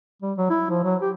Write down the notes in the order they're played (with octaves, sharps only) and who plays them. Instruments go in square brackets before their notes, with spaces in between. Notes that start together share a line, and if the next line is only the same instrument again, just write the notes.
[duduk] G3
F#3
E4
F3
F#3
G4